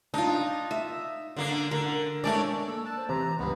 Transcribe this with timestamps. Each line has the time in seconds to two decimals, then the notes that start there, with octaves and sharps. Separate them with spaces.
0.14 D4 D#4 F4
0.71 E5
1.37 D3 A#3 D4
1.71 D3 A#4
2.24 G#3 A3 D4 C#5 D5
2.67 A#3 A4
2.85 A5 F#6
2.97 C5
3.09 C3 E3 A#5
3.39 C#2 G2 B3